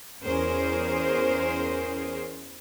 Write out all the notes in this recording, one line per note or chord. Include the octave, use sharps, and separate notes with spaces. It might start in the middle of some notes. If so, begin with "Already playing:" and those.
E2 C#4 G#4 A#4 C5